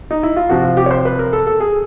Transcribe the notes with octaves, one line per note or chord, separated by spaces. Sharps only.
D#4
E4
F4
C3 F3 F#4
F4
G4
C#5
C5
B4
A#4
A4
A4
G#4